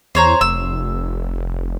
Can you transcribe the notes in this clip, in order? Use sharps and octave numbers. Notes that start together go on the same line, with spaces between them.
E2 C5 C#5 A#5
F1 E6